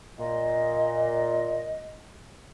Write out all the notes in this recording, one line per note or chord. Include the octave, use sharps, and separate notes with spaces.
A#2 D#5